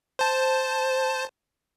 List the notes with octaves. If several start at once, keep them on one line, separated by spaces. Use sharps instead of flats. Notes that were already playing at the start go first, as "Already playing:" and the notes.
C5 A5